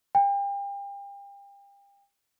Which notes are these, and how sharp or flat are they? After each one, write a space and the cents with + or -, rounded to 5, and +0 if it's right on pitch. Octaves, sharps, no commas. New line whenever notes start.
G5 +35